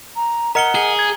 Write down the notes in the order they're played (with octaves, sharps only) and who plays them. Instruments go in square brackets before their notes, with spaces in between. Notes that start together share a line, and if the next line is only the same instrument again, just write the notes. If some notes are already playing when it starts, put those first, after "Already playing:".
[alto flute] A#5
[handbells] A#4 D#5 F6 [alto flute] F#5 [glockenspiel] A#5 C#7 G7
[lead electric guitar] G#4 [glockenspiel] G7
[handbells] G#6